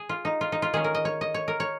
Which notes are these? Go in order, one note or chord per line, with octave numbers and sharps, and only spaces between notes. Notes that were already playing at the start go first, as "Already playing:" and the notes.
Already playing: G#4
F4
D#4
F4
D#4
F4
D#3 C#4 G#4
A#4
D#5
C#5
D#5
C#5
A#4
C#5